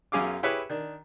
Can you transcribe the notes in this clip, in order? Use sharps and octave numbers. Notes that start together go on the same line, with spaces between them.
B1 F#2 C#4 G#4 F5 D6
E4 G4 G#4 B4 C#5 E5
D#3 D4